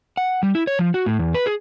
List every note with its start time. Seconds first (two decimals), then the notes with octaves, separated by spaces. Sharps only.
0.17 F#5
0.43 G3
0.55 E4
0.67 C#5
0.79 F3
0.94 F#4
1.06 A2
1.19 E2
1.34 B4
1.46 G#4